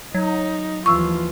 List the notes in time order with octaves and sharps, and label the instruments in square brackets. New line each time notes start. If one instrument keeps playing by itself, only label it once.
[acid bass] F#3 [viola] D#4
[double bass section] D#2 E3 F3 [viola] F4 [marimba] C#6 E6